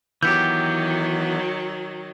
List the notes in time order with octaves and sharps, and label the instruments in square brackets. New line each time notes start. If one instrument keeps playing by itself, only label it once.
[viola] D#3 F#3 [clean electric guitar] E3 B3 G4 [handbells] G6